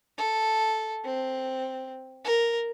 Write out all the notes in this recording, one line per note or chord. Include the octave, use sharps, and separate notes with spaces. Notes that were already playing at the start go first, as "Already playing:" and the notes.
A4
C4
A#4